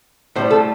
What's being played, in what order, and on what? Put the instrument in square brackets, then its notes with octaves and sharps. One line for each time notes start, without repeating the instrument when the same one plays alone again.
[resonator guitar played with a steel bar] A2 C5
G3
A4